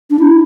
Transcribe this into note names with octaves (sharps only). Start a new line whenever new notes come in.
D4
E4